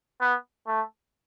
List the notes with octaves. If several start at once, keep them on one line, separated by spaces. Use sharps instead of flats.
B3
A3